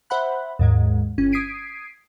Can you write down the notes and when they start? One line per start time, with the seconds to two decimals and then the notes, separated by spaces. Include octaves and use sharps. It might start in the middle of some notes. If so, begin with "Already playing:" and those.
0.10 C5 E5 F#5 B5 F#6
0.59 D#2 G#2 G#3
1.18 G1 C#4
1.32 D#6 G#6 B6 C7 D7 D#7